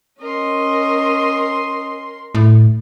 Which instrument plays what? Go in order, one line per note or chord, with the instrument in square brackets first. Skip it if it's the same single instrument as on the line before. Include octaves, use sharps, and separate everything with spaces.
[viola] C#4 D#5 [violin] A#4 C6
[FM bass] A2